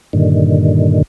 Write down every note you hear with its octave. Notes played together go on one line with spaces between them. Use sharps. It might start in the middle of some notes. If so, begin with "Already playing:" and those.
G2 A#2 D3 D#3